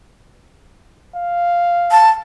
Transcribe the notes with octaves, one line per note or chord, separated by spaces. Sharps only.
F5
A5